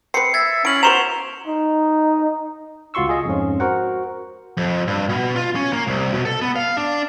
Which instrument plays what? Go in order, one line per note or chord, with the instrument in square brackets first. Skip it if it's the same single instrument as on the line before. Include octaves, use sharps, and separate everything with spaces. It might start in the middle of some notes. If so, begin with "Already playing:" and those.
[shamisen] C4 B4 [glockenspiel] C7 C#7
[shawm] E5 [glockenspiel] G#6 A6 B6
[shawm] C#4 [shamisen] E4 [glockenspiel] D7 F#7
[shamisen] B3 F#4 A#5 [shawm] C5 [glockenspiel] C#6 E7 F7
[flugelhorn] D#4
[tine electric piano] C#2 F4 F#4 C6 C#6 E6
F4 G#4 D#5
F2 G#2 C#4
F#4 A#4 C5 F#5
[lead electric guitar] F2
G2
B2
F4
C#4
A#3
C2
B2
A4
B3
F5
D4